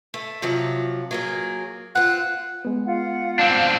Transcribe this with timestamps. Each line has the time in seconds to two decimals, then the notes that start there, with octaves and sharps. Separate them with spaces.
0.14 A3
0.42 C3 F3 F#3
1.11 F#3 A#3 G#4
1.95 C4 F4 F#5
2.65 G#3 B3
2.85 F4 F#5
3.39 C4 D4